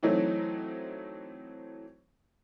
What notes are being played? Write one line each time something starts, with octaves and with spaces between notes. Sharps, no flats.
E3 F#3 A3 C4 D#4